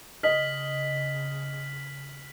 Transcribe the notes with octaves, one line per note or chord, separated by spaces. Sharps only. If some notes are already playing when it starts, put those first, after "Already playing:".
C#3 D#5 F6 B6 F#7